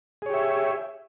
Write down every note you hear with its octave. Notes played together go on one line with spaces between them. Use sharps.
G4 G#4 C#5 E5